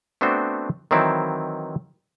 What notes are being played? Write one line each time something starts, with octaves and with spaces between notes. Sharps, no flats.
A3 B3 C4 D4 F#4 C5
D#3 E3 F#3 C4 E4